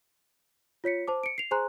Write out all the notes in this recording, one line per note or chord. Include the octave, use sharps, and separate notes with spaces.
F4 C#5 B6 C#7
C5 A5 D6
C#7 D7
C7 F7
G#4 C5 G#5 A#5 C6 F#6